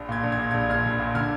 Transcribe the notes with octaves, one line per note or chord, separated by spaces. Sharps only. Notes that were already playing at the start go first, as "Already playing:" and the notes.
Already playing: A#1
A#2 G#6
A#1
G#6
A#2
A#1 G#6
A#1 F6 G#6
A#1
A#2
D3 F6 G#6